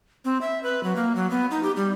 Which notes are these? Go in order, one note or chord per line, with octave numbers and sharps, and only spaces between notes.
C4
E5
B4
F#3
A#3
F#3
B3
D#4
G4
G3